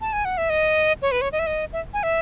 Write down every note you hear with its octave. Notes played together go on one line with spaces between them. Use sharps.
A5
G#5
F#5
E5
D#5
C#5
B4
C#5
D#5
E5
D#5
E5
G#5
E5